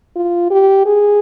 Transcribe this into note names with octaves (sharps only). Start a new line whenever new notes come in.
F4
G4
G#4